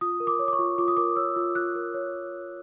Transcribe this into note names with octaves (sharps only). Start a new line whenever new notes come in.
F4 D#6
A#4
D6
C#5
D6
C#6
F4
F4 D6
D#6
A#4 D6
C#5 E6
F4
F4 F#6
A#4
C#5